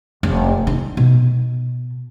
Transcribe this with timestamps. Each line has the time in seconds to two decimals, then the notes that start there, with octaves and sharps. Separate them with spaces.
0.23 F1
0.67 D#4
0.97 B2